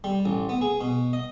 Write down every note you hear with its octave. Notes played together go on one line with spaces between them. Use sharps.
G3
A1
B3
G#4
B2
D#5